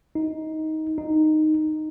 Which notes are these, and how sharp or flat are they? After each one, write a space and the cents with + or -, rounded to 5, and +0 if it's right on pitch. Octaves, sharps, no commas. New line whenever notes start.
D#4 +15
D#4 -5